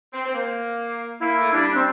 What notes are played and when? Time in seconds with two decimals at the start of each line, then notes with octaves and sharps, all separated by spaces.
0.13 C4
0.26 C4
0.34 A#3
1.20 A#3 E4
1.41 A3
1.53 G3 D4
1.75 C4